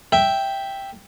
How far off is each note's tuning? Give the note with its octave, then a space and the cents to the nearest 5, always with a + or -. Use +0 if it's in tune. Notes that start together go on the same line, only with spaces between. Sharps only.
E5 +0 G5 +0